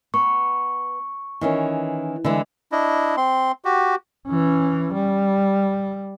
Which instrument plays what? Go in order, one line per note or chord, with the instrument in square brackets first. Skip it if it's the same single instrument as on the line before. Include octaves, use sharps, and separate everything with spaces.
[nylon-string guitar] B3 [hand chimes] C#6
[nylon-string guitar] D#3 E3 C#4
D3 E3 G#3
[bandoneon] D4 E4 D#5
C4 C6
F#4 G4
[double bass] E3 C#4
G3